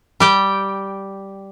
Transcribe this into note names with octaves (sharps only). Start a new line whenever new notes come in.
G3 G4 G5